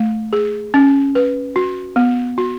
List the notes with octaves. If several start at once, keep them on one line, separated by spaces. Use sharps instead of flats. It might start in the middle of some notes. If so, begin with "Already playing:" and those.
Already playing: A3
G#4
C#4
B4
F#4
B3
F#4